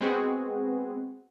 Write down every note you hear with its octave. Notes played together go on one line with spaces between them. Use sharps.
G#3 B3 C4 F#4 G#4